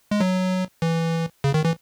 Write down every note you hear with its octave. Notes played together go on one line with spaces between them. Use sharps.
G#3
F#3
E3
C#3
D#3
E3